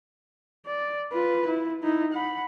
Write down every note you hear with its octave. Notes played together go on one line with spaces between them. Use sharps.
D5
F4 B4
E4
D#4 E4
F#5 B5